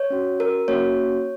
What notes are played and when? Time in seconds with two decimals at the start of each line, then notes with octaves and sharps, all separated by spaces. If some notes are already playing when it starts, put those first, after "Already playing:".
Already playing: C#5
0.10 C#4 F#4
0.40 A#4
0.68 A#3 C#4 F#4 C#5